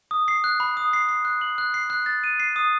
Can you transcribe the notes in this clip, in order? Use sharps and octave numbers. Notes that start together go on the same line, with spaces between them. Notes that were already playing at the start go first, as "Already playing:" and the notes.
D#6
C7
F#6
B5
D#6
C7
C7
F#6
F#7
F#6
C7
F#6
A6
D#7
C7
D#6